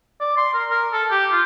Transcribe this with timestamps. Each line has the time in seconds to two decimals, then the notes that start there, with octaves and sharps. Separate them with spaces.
0.20 D5
0.37 C6
0.54 A#4
0.70 A#4
0.93 A4
1.10 G4
1.32 F4